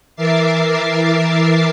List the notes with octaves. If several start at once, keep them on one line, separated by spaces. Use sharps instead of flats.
E3 A#4 E5 D6 A6 C7